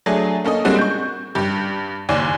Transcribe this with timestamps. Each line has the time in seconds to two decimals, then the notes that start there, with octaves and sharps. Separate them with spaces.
0.06 F#3 A3 D4 G#4
0.44 A#3 C#4 A4 D#5
0.65 G3 G#3 A#3 C4 D4 F#4
0.79 C#6 G6
1.35 G2 G4
2.09 F#1 D#2 D5 G#5